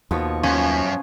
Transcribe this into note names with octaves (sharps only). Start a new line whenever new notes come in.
D#2 B2 F3 C#6
F#2 C#4 F4 G#5